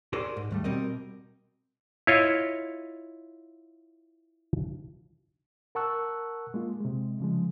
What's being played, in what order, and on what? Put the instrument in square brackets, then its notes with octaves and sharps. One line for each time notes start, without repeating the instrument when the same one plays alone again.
[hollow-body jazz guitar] G4 G#4 A#4 C5 D5
G#2
D#2 G3 A3
B2 G3 C4 A#4 D#5
[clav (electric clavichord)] E4 F4 C#5 D#5 F5
[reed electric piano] A#4 F#5 A5 C#6 E6 F#6
G#3 A#3 F4
C3 G#3
C#3 F3 G#3